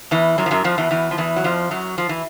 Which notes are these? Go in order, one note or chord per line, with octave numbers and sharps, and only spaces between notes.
E2 E3
F#2 F#3
F3
F#2 F#3
F2 F3
E2 E3
E2 E3
F3
E2 E3
F#3
F2 F3
F#2 F#3
F3
E3